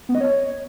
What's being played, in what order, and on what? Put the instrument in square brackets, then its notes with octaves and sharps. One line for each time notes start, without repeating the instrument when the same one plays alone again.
[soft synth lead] B3
D#5
C#5